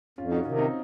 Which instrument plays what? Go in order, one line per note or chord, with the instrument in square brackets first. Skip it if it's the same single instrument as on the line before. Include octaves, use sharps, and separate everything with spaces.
[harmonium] F2 [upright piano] C#4 F4
[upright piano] D#4 F#4
[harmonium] C3 D#3 [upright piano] C#4 F4
[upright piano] C4 D#4